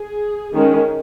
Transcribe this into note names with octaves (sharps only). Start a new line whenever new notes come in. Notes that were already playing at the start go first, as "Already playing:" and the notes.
Already playing: G#4
D#3 G#3 C#4